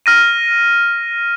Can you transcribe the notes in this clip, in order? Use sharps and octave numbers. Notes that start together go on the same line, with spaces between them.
F6 A#6 D#7